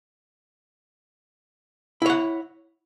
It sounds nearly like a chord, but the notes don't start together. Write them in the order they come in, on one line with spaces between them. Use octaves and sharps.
E4 C#5 F#5